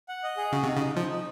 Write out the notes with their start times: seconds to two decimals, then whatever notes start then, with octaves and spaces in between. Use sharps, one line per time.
0.09 F#5
0.23 D#5
0.37 G#4
0.52 C#3 F#4
0.63 C3 D#4
0.76 C#3
0.81 D#4
0.96 F3 D#4
1.11 D#4